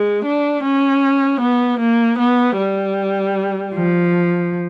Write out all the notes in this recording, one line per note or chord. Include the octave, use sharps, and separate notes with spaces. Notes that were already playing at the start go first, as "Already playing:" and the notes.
Already playing: G#3
D4
C#4
B3
A#3
B3
G3
F3